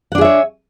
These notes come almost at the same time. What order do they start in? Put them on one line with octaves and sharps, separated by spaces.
F#5 D4 G#4 E5 C#5